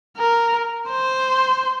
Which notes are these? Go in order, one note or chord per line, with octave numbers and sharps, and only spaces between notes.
A#4
C5